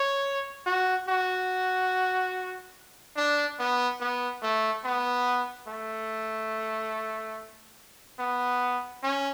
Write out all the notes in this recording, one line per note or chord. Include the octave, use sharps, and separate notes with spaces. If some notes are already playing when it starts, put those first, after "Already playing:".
Already playing: C#5
F#4
F#4
D4
B3
B3
A3
B3
A3
B3
C#4